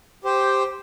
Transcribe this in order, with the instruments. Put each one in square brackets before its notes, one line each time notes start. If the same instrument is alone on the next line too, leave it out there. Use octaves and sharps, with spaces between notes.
[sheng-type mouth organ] G4 C5 G5